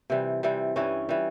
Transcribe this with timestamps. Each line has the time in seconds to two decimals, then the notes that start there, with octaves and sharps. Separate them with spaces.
0.10 C3 E3 G3
0.43 C3 E3 G3
0.76 G2 E3 G3 C#4
1.09 E3 G3